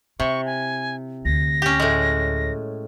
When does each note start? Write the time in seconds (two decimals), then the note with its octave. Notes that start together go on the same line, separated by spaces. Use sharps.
0.20 C3 E4 C#6
0.46 G#5
1.25 D2 A#6
1.62 C#4 G4
1.80 A2 G#3